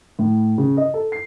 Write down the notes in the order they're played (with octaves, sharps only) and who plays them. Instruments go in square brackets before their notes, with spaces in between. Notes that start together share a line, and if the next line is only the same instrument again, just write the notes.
[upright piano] A2
C#3
D#5
A4
C7